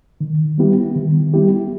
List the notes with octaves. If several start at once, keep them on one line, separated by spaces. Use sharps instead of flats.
D#3
G3 B3 E4 G4
D#3
G3 B3 E4 G4